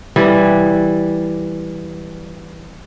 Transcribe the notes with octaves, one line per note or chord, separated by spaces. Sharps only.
E3 G3